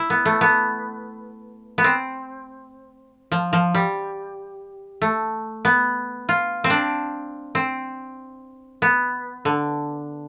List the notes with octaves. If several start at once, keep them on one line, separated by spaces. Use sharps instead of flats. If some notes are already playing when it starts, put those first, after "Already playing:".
Already playing: E4
B3
A3
B3
B3
C4
F3
F3
G3
A3
B3
F4
C4
D4
C4
B3
D3